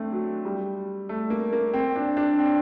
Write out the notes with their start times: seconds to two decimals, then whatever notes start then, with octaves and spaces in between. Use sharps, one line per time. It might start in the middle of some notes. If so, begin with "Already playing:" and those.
Already playing: A3 C4 D4
0.12 F#3
0.45 G3
1.09 A3
1.30 A#3
1.53 A#3
1.74 C4
1.96 D4
2.17 D4
2.38 C4